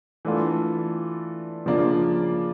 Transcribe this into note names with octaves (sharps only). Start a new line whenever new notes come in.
E3 A3 D4 F4 A4
C#3 F3 A#3 D4 F4